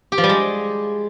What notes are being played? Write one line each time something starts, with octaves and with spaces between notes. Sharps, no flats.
G4
F3
G3
G#3